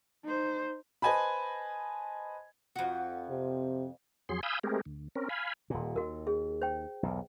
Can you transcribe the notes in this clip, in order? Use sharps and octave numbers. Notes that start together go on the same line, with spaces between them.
D#4 C5
B4 C5 D#5 G#5 A5 B5
F2 F#4
C3
F2 F#3 G#4 C6
F5 G#5 B5 D#6 E6 G6
G#3 A3 C4 G4 G#4 A#4
D2
C4 C#4 A#4
F5 G#5 B5
D#1 A#2
D#2 F#4 A#4
G#4
C5 G5
B1 E2